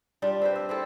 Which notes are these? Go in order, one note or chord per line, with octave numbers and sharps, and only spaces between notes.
G3 D4 F4
C4 B4 C5
E5
C4 E4 A4